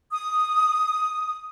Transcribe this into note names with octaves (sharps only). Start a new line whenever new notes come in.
D#6